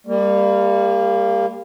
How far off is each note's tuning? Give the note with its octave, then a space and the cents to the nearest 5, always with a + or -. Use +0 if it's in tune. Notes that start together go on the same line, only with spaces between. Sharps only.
G3 +25 A#3 -15